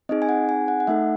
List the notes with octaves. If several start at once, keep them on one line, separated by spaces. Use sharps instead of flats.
C4 D#4 G#4 D#5
G#5
F#5
G#5
F#5
F#5
A3 D#4 A4 E5